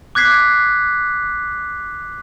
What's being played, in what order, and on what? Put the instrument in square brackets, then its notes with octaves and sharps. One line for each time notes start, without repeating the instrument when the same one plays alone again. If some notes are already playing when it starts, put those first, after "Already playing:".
[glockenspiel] D6 F#6 G#6 B6 C7